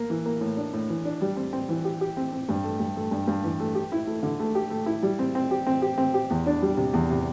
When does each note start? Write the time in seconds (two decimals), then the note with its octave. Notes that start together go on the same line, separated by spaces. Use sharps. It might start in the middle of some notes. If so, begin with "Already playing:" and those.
Already playing: A#3
0.10 E3
0.26 A#3
0.41 A2
0.57 D4
0.73 A2
0.89 E3
1.05 D4
1.21 G3
1.37 C4
1.53 C4
1.69 E3
1.85 G4
2.01 G4
2.17 C4
2.32 C4
2.49 G2
2.63 A3
2.80 G2
2.96 A3
3.11 G2
3.27 G2
3.44 E3
3.60 A3
3.75 G4
3.92 E4
4.07 A3
4.23 D3
4.40 A3
4.55 G4
4.70 A3
4.86 E4
5.03 G3
5.19 C4
5.35 C4
5.51 G4
5.67 C4
5.82 G4
5.98 C4
6.14 G4
6.30 E2
6.46 D4
6.62 G3
6.77 C3
6.93 E2
7.10 C3